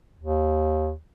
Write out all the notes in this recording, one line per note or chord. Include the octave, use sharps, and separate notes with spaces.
D#2